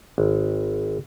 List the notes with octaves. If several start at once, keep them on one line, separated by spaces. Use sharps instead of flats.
G#1